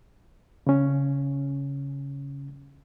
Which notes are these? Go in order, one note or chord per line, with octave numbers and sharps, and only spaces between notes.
C#3 C#4